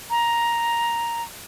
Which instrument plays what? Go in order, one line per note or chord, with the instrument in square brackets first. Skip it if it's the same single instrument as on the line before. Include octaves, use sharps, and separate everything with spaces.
[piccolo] A#5